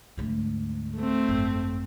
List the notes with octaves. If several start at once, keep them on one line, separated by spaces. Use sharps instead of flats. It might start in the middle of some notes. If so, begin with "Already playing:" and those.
D2 G#2
A3 C4
G#1 F#2